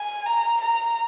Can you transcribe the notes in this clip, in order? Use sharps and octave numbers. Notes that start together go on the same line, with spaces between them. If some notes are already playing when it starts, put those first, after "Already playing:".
Already playing: G#5
A#5
A#5